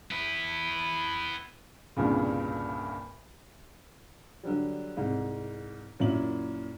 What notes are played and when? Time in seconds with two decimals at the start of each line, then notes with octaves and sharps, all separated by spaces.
0.11 B3 E4
1.97 C2 G2 A#2 C#3
4.43 D3 F#3 G3
4.97 C2 G#2
5.99 F#2 A#2 E4 F#7